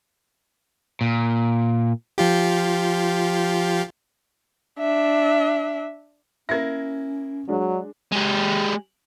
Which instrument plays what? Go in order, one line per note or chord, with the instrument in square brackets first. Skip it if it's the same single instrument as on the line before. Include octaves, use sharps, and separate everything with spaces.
[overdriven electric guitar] A#2
[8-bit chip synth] F3 F4 G4
[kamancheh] D4 E5
[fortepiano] A#3 E4 [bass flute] C#4 [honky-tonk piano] G#6 A#6
[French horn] F#3 [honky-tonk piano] G#3 D4
[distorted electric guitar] G#3 G4